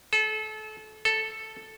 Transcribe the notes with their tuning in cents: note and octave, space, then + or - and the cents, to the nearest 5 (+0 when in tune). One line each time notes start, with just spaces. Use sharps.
A4 -30
A4 +0